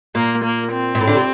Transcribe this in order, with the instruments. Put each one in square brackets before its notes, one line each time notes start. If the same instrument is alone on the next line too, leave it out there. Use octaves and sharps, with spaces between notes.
[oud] A#2 [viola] A#3
[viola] A#3
C4
[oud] A#2
A2
D3
C3